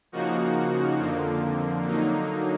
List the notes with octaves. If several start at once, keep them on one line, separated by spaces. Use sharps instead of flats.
C#3 F3 A#3 D#4 F#4
F2 D3 F3 A#3
D3 F#3 A#3 D#4